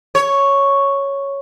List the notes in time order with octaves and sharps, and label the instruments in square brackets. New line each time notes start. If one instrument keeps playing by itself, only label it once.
[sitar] C#5